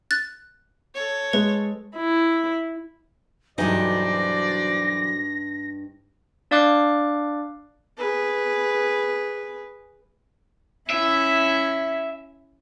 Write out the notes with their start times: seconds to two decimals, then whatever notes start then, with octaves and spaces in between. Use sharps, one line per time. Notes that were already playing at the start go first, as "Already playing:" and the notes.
0.11 F#6 A6
0.95 A4 C#5
1.33 G#3 B4
1.96 E4
3.58 B1 G2 E3 D#4 F#4 C5 D5 A#6
6.51 D4 D5 F5 D6 F#6 C7
7.98 G#4 B4
10.90 C#4 E4 E5